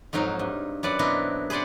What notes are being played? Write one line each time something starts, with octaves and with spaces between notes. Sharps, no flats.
F2 G#2 F#3 D#4 F5
G2
F#2 B4 D5 F#5
B2 B3 C4 D4 E4 A#4
G#4 B4 C5 D5 F#5